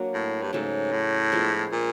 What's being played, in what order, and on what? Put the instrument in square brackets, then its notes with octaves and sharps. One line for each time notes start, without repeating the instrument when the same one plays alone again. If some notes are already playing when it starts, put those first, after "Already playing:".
Already playing: [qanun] F#3 A#3 D4 F#4
[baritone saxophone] A2
G2
[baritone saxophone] G#2 [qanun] C#3 F#3 A3
[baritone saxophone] A2
[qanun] F3 G#3 B3 D4
[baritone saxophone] A#2